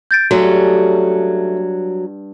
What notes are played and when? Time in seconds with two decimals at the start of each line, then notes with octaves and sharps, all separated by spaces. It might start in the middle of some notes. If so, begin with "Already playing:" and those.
0.11 G6 A6 D7
0.31 G2 F#3 A3 C#4 F#4 G#4